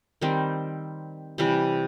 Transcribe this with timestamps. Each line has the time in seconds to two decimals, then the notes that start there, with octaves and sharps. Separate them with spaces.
0.22 D#3 G3 C4
1.38 C3 E3 G3